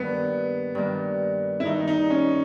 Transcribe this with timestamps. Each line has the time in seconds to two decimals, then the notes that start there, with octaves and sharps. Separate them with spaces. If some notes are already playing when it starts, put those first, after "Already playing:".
Already playing: G2 D#3 A#3 B3
0.75 G2 D#3 A#3
1.60 E4
1.65 G2 D#3 A#3 D#4
1.88 D#4
2.10 C#4